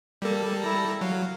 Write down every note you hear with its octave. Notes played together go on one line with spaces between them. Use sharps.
G3 A#3 A4
E4 A#5
F#3 F5